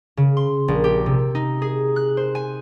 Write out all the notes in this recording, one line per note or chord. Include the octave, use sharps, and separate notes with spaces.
C#3
C6
A#1
G4
C3
D#4
G#4
F#6
C5
G#5